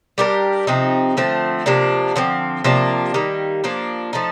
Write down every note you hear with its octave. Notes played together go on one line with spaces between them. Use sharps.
G3 D4 G4 A#4
C3 F3 C4 D#4
D3 F3 A3 C4
C3 F3 A#3 D4
D3 F3 C4
C3 F3 A#3 D4
D#3 G3 A#3
F3 A#3 D4
F3 A3 D#4